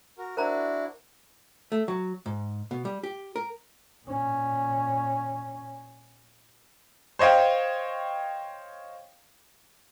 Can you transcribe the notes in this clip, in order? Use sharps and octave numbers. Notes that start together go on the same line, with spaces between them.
F#4 A#4
D4 E4 F#4 A#4 C5 A#5
A3
F#3
G#2
B2
G3
G4
A#4
A#2 C#4
C5 C#5 D#5 F5 G5